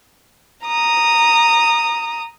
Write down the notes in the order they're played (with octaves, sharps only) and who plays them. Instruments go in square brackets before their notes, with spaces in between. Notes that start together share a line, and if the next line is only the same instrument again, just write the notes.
[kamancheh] A#5 D#6